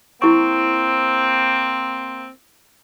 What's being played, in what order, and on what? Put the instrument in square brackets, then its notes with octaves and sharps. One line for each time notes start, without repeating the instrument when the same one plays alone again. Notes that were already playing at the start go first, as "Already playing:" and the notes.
[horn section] A#3 C4 [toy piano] E4 C#6